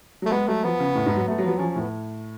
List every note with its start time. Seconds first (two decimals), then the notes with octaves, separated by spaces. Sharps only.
0.22 F#3 A3
0.31 G#3 B3
0.48 F#3 A3
0.64 F3 B3
0.80 C#3
0.95 A2
1.06 G#2
1.16 F#3
1.28 A3 B3
1.38 F#3
1.44 F3 B3
1.49 F#3
1.59 F3 C#4
1.70 C#4
1.76 A2 B3